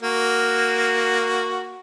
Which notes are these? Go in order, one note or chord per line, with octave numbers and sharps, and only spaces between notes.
A#3 F#4